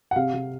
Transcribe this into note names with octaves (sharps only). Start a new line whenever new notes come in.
F#5
C3 F5
C3